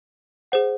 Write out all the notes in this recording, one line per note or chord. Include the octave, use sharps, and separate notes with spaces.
G#4 C5 F#5